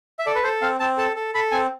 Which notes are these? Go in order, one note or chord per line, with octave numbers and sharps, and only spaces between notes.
E5
A4 D5
B4
A4 C5
C4 F5
C4 A5
A4 A5
A4
A4 B5
C4 G#5